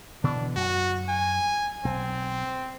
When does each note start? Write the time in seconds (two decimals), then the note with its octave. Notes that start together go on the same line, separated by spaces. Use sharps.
0.24 B2 D3 E3 D4
0.56 F#2 F#4
1.09 G#5
1.85 B1 C4